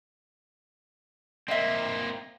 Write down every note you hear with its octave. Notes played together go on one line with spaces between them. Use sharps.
A#3 C4 D#5 E5